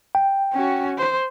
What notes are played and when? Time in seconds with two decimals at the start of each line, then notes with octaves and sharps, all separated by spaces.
0.15 G5
0.53 C#4 F#4
0.98 C5